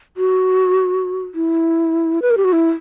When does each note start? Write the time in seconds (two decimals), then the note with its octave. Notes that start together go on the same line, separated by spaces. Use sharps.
0.17 F#4
1.35 E4
2.22 B4
2.30 A#4
2.37 G4
2.44 F#4
2.53 E4